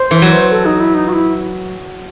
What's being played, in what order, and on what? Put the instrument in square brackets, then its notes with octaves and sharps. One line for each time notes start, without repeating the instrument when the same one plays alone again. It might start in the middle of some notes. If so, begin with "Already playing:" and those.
Already playing: [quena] C5
[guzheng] E3
F#3
[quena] A4
D#4
E4
D#4
F#4
E4